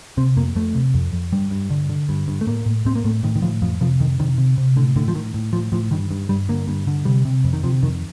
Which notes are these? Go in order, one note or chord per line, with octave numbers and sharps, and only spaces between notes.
C3 C4
F2 A#3
F2 A3
C3
F2
F2
G2 G3
G2
D3
D3
G2
G2
A3
A2 A#3
A2
A2 C4
A#3
A2 A3
A2 D#3
D#3
A2 F3
F2 F3
C3 F3
F2 D#3
C3 D#3
C3
C3
A2 D3
A2 D3
F3
A2 D#3
A2
A2 F3
A2 F3
G2 D#3
G2
G2 G3
D3 A#3
G2
D3
C3 G3
C3
F2
D#3
C3 F3
F2 D#3